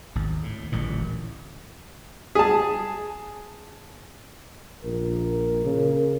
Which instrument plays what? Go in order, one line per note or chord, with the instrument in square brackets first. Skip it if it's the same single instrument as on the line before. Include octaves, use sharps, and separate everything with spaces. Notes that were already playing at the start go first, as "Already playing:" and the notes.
[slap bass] G#1 D#2
A2
D1 A1 A#2
[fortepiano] G#4 A5
[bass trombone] A#1 [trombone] A#4
[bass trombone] C#3